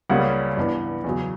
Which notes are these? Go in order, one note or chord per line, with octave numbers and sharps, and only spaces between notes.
C#2 C#3 G3 A#3 C#4 F#5
G2 E3 B3 D4
E2 C#3 F#3